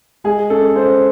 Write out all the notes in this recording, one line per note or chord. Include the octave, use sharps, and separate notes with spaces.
G#3 G#4
C#4 A4
C#4 C5